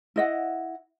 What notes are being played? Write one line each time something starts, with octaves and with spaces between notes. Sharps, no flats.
E4 D#5 F#5